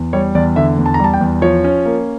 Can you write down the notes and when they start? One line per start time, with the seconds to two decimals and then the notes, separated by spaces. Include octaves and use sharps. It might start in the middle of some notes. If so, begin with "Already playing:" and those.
Already playing: E2
0.13 G3 C#5
0.35 E2 D5
0.56 D3 E5
0.78 E2
0.86 A5
0.94 A#5
0.99 G3
1.04 A5
1.13 G5
1.21 E2
1.42 F3 C#5
1.64 C#4
1.86 A#3